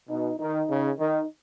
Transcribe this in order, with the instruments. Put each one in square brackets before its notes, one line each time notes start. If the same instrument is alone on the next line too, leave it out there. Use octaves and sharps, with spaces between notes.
[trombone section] B2 [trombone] D#4
[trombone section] D#3 [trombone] D#4
[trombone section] C#3
[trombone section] D#3 [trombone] D#4